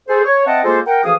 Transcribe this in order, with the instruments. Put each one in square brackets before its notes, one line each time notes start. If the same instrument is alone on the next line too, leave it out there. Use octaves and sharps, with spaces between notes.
[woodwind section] G#4 A4 C5
C#5
C4 D#5 E5 F#5 G5 A5
G#3 A#3 F4 A4 C5
A#4 F#5 G5
D2 E3 F3 G#4 F5 D#6